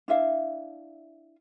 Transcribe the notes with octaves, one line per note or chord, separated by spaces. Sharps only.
D4 E4 E5 F5